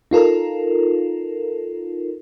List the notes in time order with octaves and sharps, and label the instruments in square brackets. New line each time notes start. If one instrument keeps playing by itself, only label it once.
[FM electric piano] D#4 F4 A4 A#4